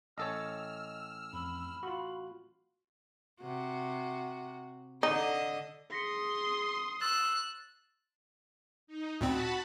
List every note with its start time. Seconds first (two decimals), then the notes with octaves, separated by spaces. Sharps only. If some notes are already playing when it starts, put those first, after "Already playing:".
0.18 A1 A4 C#5 D#5 E6 F6
1.33 F2 B5
1.83 F4 F#4
3.41 C3 F#4
5.03 D3 D#4 D#5
5.92 G#4 C6 D#6 A#6 B6 C#7
7.01 E6 F#6 A6 E7
8.87 D#4
9.21 D2 A#2 C4 F#4 A5 B5